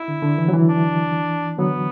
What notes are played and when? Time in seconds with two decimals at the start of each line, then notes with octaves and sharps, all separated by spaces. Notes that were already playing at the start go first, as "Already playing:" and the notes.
Already playing: E4
0.08 D3
0.22 D3
0.38 E3
0.49 F#3
0.54 E3
0.69 D4
1.58 D3 F#3 B3